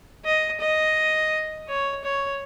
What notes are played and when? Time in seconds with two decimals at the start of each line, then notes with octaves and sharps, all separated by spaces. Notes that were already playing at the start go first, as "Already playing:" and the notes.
0.25 D#5
0.60 D#5
1.68 C#5
2.04 C#5